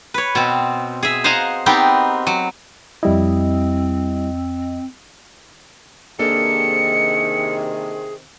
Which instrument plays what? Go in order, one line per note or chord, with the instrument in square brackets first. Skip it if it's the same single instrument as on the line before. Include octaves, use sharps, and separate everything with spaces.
[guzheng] B4 C#5
B2 C4
G#4 E5
C5 D#5 F5 F#5 G#5 A#5
B3 C4 D#4 G4 A#4
F#3
[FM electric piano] F2 D#5 [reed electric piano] G3 E4 [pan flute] C4
[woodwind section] C3 D#3 [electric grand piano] A#3 D4 A4 [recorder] G#4 [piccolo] C#7